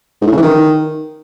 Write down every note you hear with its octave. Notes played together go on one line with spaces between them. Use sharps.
G#2
A2
C#3
E3
D#3